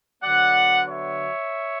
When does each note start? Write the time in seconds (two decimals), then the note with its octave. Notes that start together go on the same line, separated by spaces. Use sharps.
0.22 D3 F#3 B3 D5 F#5
0.89 C#5 E5